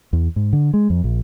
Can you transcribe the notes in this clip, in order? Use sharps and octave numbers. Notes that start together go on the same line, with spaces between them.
E2
G#2
D3
G#3
F2
A#1